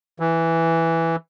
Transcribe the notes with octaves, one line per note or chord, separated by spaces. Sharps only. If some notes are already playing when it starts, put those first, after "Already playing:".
E3